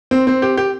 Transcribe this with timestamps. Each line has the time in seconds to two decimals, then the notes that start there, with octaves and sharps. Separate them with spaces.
0.11 C4
0.27 C4
0.42 G4
0.57 G4